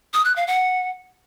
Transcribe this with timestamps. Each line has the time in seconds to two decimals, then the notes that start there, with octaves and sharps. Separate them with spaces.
0.14 D#6
0.25 F#6
0.36 F5
0.47 F#5